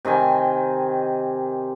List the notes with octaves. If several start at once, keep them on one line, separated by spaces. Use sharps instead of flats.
C3 D#3 G5 G#5